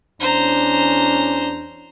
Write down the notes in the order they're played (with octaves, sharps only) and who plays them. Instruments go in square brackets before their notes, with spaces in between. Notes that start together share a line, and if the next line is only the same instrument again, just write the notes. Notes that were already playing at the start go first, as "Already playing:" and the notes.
[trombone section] E2 C#4 D4 [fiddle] C5 A#5